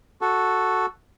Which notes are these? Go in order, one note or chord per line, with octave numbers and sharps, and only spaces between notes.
F#4 A4